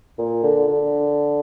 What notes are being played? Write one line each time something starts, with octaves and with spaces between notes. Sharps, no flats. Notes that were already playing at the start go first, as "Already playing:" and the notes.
A#2
D3
D3